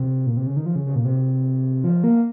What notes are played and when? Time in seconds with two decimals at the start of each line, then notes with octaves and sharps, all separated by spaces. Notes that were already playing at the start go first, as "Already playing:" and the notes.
Already playing: C3
0.27 A#2
0.37 C3
0.47 C#3
0.57 D#3
0.66 F3
0.76 C#3
0.86 C#3
0.95 A#2
1.05 C3
1.84 F3
2.04 A#3